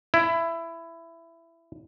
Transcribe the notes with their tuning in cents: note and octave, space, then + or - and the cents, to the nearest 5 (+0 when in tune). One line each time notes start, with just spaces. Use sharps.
E4 +15